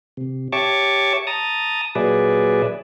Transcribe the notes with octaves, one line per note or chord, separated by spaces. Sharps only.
C3
G4 C#5 E5 A5 C#6 D6
A5 A#5 D#6
A#2 F#3 G#4 B4 D5 E5